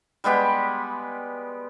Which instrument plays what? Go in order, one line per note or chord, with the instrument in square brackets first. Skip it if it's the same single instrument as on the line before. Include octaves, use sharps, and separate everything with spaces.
[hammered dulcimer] G3 G#3 B3 G4